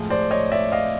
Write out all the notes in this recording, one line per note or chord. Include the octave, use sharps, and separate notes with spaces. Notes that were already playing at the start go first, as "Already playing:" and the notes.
Already playing: A2 F3 G#3
C5 D5
C#5 D#5
D5 E5
D#5 F5